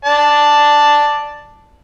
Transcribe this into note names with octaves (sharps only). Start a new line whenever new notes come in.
D5 A5